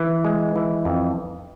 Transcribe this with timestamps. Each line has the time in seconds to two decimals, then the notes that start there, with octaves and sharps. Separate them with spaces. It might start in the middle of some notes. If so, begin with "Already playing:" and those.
Already playing: E3
0.25 G#3
0.56 E3
0.85 F2